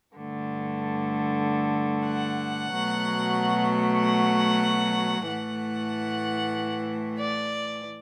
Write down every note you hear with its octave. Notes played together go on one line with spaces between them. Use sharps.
G2 D3 A3
F#5
B2 F#3 A3
F#5
A2 E3 A3 F#5
D5